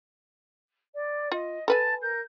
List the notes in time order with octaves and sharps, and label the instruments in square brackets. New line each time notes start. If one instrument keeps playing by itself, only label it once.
[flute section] D5
[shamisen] F4 [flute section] D#5
[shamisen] A4 B4 G#5 [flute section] A5
[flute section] A#4 G6